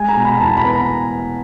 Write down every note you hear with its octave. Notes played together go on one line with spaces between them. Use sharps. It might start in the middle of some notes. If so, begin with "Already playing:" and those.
Already playing: G#3 G#5
A#5
B2
B5
A5
E2 A#5
B5
B3
A#5